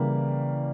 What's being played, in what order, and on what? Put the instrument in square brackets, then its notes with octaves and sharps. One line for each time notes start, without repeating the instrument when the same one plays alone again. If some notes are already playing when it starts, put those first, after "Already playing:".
Already playing: [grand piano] C#3 E3 G3 A#3